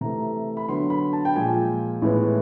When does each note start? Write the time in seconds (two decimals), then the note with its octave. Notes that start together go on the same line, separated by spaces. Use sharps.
0.01 C3 E3 A3 A#5
0.57 B5
0.69 D3 F#3 B3 C6
0.90 B5
1.13 A5
1.25 G5
1.35 A#2 F3 G#3 G#5
2.02 A2 E3 G#3 B3